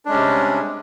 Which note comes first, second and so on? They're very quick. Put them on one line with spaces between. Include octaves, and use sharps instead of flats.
D4 G#3 C#4 G3 C3